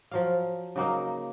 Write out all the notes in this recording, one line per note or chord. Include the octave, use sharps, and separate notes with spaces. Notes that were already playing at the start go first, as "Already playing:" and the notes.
F3 F#3 F5
C#3 F#3 A#3 D#4